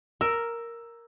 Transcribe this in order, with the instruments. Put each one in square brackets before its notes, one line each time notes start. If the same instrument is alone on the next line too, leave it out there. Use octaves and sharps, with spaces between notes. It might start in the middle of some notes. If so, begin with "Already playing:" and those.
[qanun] A#4 [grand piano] E6